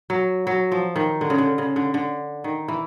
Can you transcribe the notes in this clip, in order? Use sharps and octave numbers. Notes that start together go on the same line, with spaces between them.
F#3
F#3
F3
D#3
D3
C#3
D3
C#3
D3
D3
D#3
E3